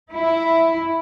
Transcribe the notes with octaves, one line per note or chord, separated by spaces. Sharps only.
E4